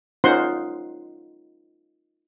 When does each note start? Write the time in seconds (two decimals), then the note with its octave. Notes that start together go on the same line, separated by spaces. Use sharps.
0.24 C#4 D#4 F4 C5 F#5 C6